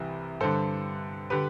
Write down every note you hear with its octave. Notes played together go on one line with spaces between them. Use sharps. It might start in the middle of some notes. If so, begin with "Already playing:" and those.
Already playing: C2 C3 E3
G2 D3 A4 C5
D3 G4 B4